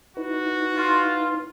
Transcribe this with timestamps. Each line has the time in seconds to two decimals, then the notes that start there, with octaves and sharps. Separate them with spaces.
0.17 D#4 E4 F#4 B4
0.75 F4